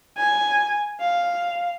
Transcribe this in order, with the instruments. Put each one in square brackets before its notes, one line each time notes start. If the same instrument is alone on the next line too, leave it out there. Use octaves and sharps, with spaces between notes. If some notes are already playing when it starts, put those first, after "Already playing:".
[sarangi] G#5
F5